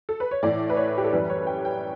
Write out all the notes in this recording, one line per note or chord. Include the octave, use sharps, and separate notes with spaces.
A4
B4
C#5
A2 E3 A3 D5
B4
C#5
G4
A4
F#2 E3 G3 B4
C#5
G5
G5